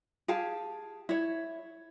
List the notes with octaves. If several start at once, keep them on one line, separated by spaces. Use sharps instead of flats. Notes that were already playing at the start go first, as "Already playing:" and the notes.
G4 G#4 F5 A5
E4 C#5